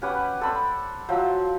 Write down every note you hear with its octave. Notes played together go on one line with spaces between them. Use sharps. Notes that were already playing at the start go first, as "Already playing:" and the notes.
C#4 G4 B4 F#5
A4 C5 D5 B5
F3 F#3 C5 E5